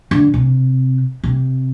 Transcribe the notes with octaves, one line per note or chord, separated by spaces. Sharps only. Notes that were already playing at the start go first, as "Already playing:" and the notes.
D3
C3
C3